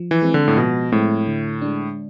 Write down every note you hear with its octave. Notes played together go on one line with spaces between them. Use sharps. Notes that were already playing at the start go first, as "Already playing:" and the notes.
Already playing: F3
E3
G#3 C4
D3
A2
B2 F3
A2 G#3 C4
D3
G#3 D4